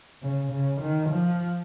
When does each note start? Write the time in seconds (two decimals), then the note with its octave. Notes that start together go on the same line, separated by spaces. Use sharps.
0.23 C#3
0.52 C#3
0.81 D#3
1.10 F3